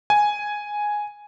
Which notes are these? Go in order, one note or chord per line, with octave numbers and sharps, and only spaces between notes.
G#5